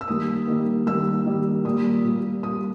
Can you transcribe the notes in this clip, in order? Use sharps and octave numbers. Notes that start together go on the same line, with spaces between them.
E6
D#3 G3 A#3 D#6
D#3 G3 A#3
D#3 G3 A#3 E6
D#3 G3 A#3
A#2 G3 A#3 D#6
A#2 G3 A#3
A#2 G3 A#3 D#6